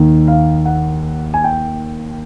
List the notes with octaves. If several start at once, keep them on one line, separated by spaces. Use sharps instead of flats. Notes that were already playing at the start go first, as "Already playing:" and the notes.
Already playing: D#2 D#3
F5
F#5
G#5
G5